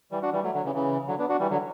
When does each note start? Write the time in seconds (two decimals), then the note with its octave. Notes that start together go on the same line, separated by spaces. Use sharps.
0.12 E3 G3
0.22 D4 F#4
0.33 E3 G3
0.43 F#3 A3
0.54 D3 F#3
0.65 C#3 E3
0.75 C#3 E3
1.08 D3 F#3
1.19 B3 D4
1.29 D4 F#4
1.40 E3 G3
1.50 D3 F#3